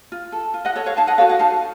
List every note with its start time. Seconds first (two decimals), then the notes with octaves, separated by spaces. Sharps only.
0.12 F4
0.32 A4
0.54 F4
0.65 D#5 F#5
0.76 A4 C#5
0.86 C#5 F5
0.97 D#4 F5 A5
1.07 D#5 F#5
1.18 F#4 A4 C#5 F5
1.29 D#5 F#5
1.39 D#4 F5 A5